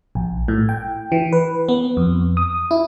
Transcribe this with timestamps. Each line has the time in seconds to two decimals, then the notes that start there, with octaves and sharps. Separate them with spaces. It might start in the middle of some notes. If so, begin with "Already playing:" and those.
0.15 A#1
0.48 A2
0.69 G5
1.12 E3
1.33 B4
1.69 B3
1.97 F2
2.37 D#6
2.71 E4